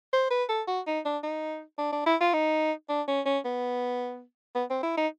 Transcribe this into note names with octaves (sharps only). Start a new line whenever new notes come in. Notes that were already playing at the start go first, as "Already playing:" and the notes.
C5
B4
A4
F#4
D#4
D4
D#4
D4
D4
E4
F4
D#4
D4
C#4
C#4
B3
B3
C4
E4
D#4